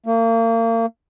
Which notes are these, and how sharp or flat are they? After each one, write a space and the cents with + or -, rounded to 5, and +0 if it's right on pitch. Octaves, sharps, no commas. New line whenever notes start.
A#3 -35